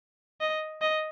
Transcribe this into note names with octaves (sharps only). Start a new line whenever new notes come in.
D#5
D#5